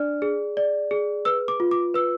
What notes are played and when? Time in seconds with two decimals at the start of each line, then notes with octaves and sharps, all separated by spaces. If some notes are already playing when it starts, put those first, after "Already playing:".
Already playing: D4 D5 F6
0.22 G#4
0.57 D5
0.91 G#4
1.25 B4 E6
1.48 D6
1.60 F4
1.71 D6
1.94 B4 E6